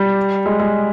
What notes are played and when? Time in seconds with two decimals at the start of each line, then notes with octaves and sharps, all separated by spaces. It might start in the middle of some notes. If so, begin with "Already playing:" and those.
Already playing: G3
0.46 G#3
0.60 G#3